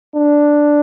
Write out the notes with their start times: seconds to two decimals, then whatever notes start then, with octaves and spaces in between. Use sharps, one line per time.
0.14 D4